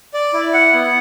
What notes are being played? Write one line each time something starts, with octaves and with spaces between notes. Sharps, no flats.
D5
E4
F#5
B3